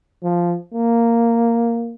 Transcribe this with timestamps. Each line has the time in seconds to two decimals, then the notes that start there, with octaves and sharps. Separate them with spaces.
0.23 F3
0.73 A#3